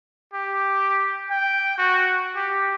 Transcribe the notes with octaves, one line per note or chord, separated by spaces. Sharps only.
G4
G5
F#4
G4